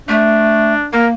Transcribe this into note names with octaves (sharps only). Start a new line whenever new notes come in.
A3 D4
A#3 A#4